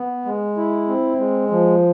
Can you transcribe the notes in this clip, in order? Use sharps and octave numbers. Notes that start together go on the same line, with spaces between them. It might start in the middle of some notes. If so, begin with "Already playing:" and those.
Already playing: B3
G#3
E4
C4
G#3
F3